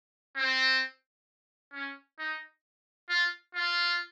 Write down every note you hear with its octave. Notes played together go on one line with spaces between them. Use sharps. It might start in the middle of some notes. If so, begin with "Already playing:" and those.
C4
C#4
D#4
F4
F4